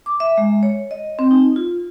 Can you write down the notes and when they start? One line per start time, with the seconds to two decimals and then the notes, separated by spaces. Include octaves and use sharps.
0.06 D6
0.20 E5
0.38 G#3
0.63 C#5
0.91 D#5
1.19 C4
1.31 D#4
1.56 F4